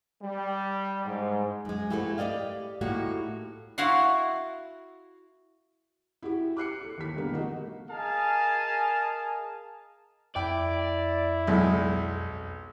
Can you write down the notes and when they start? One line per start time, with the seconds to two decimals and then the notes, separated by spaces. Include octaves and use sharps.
0.21 G3
1.05 G#2
1.65 F#2 G#3
1.90 A3 A#3 C4 E4 F#4 G4
2.18 G4 G#4 D5 D#5 F5
2.81 A2 A#3 D#4 F#4 G4
3.78 E4 F#4 F5 F#5 C6
6.22 E4 F#4 G4
6.57 D6 F#6 C7 C#7
6.81 G4 A4
6.98 D#2 B6
7.16 B2 D3 G3 A#3
7.32 D#3 A3 F#4 D#5
7.91 G#4 A#4 D#5 F5 G#5 A5
10.36 F2 E4 D5 G5
11.47 B1 G#3